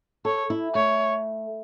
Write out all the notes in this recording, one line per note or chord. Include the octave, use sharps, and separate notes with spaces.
A4 C#5
E4
A3 C#5